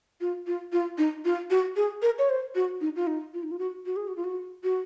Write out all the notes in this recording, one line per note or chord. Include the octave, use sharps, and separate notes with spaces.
F4
F4
F4
D#4
F4
F#4
G#4
A#4
C#5
C5
F#4
D#4
F4
D#4
F4
D#4
F4
F#4
F#4
G#4
F#4
F4
F#4
F#4